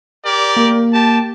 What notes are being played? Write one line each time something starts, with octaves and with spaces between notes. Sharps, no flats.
G4 A#4 D5
A#3
G4 A5